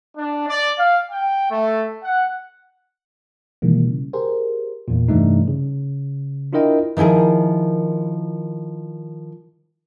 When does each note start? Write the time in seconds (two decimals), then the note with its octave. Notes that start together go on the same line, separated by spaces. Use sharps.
0.17 D4
0.48 D5
0.79 F5
1.11 G5
1.51 A3
2.03 F#5
3.62 B2 D#3 E3 G3 G#3 A#3
3.87 C#3
4.13 G4 G#4 A#4 C5
4.88 E2 A#2
5.08 G2 C3 E3 G3 A3 D#4
5.48 C#3
6.53 D4 E4 F4 A#4 D#5 G5
6.97 D#3 F3 E4 G#4 A#4